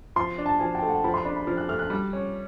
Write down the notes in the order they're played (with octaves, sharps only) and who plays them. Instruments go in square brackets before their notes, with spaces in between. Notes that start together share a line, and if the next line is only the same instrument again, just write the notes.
[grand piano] F3 [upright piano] C6
[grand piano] D4
[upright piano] A5
[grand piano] F3 [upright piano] G#5
[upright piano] G5
[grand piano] A3
[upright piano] F#5
[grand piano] F3 [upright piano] B5
[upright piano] C6
[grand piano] D4 [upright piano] B5
[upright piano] B5
[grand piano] F3 [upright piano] F6
[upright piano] F#6
[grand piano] A3 [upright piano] F6
[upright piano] F#6
[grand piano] G3
C#4